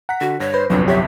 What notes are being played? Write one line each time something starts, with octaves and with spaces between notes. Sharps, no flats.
F#5 A#5 B6
D3 F#4
G2 C#5 A#6
B4 C5
G1 C2 F2 F#3 D4
G4 C#5 E5